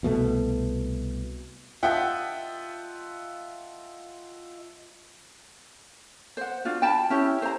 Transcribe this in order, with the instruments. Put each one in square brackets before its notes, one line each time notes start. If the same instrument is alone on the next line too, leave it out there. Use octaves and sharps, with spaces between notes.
[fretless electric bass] C2 B2 G#3 A3
[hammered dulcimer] F4 D#5 A5 [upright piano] E5 F#5 G5
[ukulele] C5 F#5
D4 F4 F#4
G5 A5 B5
C#4 E4 G4
C5 A#5